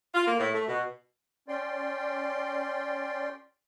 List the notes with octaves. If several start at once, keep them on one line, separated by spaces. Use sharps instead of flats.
F4
A#3
A2
A3
B2
C#4 D5 G5 C6